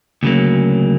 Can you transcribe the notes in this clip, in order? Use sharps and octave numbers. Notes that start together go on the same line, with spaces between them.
D2 C#3 F#3 A#3